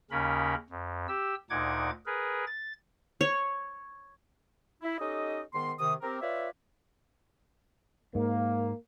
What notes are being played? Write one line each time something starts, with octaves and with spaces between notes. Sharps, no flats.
D#2 C#3 C#4 A#4 B5
F2
G4 E6
D2 A#2 D#4 F#5 D6 G#6
G#4 A#4 B4
A6
C#5
E4
C#4 D#4 G4 A4 D#5
G#2 D#3 B3 C6
C3 D#3 D#6
C4 G4 A#4
F4 B4 C#5 D5 E5
G#2 A#3